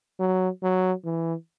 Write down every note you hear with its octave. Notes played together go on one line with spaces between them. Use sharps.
F#3
F#3
E3